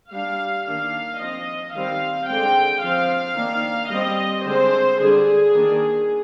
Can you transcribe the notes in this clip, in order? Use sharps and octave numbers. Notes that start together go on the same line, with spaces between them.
G3 D4 F5
D#3 A#3 D4 F5
F3 C4 D#5
D#3 G3 C4 F5
D3 G#3 C4 G5
F3 C4 F5
D#3 A#3 D4
G3 C4 D#5
D3 G#3 C4 C5
D3 G3 D4 G#4
D#3 A#3 D4